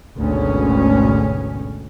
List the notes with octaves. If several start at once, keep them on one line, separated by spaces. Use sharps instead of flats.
G#1 D2 B2 B3 C#4